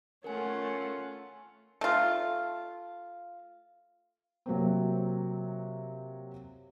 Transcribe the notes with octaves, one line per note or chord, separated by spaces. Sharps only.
A3 C#4 F4 A#4 F#5 G#5
A3 F4
C3 F#3 A#3 C4